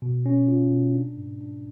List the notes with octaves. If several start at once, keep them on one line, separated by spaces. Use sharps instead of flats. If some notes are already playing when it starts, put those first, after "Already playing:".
B2
C#4
F4
B2
D4
G#2
D4